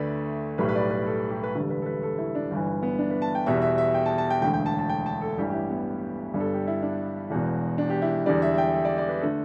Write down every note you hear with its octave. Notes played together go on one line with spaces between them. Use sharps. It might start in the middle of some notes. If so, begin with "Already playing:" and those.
Already playing: D2 D3 A3 B4 D5
B1 A2 G3 B4
B4
D5
B4
A4
G4
B4
E1 D2 D3 G3 A4
B4
A4
B4
A4
E4
D4
G1 G2 E3
B3
D4
B4
A5
G5
E2 B2 G3 E5
E5
E5
G5
A5
A5
G5
E1 D2 D3 G5
G5
A5
A5
G5
A5
A4
A1 G2 E3 G3 G4
G4
E4
B3
G1 G2 G3
A4
G4
E4
D4
E1 E2 B2
D4
G4
E4
E2 D3 G3 D5
E5
E5
G5
E5
D5
D5
B4
D3 A3 A4